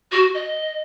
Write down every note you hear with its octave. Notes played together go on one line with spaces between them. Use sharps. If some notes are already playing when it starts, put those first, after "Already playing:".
F#4
D#5